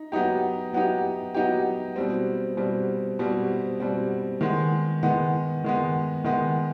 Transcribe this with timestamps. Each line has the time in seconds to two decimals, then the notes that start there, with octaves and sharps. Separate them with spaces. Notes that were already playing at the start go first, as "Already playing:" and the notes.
Already playing: D#4
0.12 F#3 B3 D#4 G4
0.73 F#3 B3 D#4 G4
1.34 F#3 B3 D#4 G4
1.96 B2 G3 C4
2.57 B2 G3 C4
3.19 B2 G3 C4
3.80 B2 G3 C4
4.41 D#3 G#3 B3
5.03 D#3 G#3 B3
5.64 D#3 G#3 B3
6.24 D#3 G#3 B3